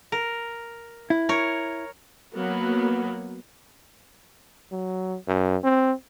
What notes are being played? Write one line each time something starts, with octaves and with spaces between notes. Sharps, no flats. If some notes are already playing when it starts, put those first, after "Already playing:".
A#4
E4
A#4 C#5
F#3 A#3 B3
F#3
F#2
C4